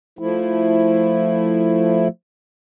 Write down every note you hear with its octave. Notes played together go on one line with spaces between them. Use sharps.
F3 A3 E4